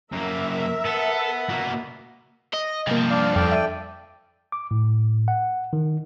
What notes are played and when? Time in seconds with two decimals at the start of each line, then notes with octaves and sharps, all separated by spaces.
0.13 F#2 A#3 A#4 E5
0.85 B3 A4
1.49 B2 A#3
2.53 D#5
2.87 G2 C3 F3 A#3
3.10 D4 D5 F5
3.36 F2 A4 D5 G5
3.51 E5 D#7
4.52 D6
4.71 A2
5.28 F#5
5.73 D#3